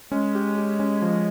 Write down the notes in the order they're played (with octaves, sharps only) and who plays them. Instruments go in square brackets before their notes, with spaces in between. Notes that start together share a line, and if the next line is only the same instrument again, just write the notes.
[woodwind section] G#3 [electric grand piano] C#4
[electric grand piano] G4
G4
C#4
F3